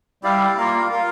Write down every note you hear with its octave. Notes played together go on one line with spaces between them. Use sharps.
G3 E4 G4 D5 F5
A#3 F4 A#4 F5
F4 A#4 F5